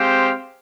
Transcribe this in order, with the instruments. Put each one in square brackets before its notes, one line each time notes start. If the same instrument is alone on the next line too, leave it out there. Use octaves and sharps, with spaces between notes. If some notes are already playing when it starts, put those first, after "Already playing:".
Already playing: [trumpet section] G#3 C4 G4 C5 F5